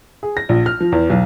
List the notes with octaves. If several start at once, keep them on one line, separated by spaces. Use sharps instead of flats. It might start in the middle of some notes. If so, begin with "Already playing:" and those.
G#4
A#6
A#1
F6
F3
E2
B1